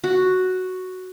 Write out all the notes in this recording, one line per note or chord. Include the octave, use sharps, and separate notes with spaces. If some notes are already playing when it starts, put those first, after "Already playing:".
F#4